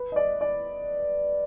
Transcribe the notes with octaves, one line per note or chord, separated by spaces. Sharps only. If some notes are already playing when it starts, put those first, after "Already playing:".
Already playing: B4
D#5
D5
D5